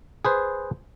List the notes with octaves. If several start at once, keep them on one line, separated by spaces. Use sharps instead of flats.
G#4 B4 C5